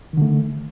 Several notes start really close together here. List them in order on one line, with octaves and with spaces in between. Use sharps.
D#3 D3 A3